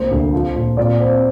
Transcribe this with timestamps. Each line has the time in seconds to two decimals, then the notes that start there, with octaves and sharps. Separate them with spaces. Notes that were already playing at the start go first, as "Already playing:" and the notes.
Already playing: C2 A#3 C5
0.10 D2
0.33 F3
0.55 A#2
0.77 A#2 D5
1.00 C4